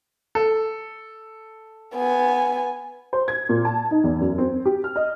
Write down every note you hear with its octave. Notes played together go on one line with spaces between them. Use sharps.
A4
B3 G#5
C5
G#6
A#2
A5
D#4
E2
F#2
C4
G4
F6
D#5